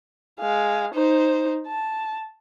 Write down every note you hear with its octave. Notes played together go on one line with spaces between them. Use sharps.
G#3 F5
D#4 C5
A5